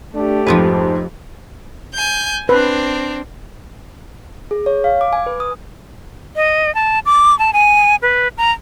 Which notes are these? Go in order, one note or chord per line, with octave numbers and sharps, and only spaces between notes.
A3 D4 G4
F2 G#2 F3 F4 B4 C5
G#5 G6
C4 D4 B4
G#4
C#5
F5
D6
G#5
B4
D#6
D#5
A5
D6
A5
G#5
B4
A#5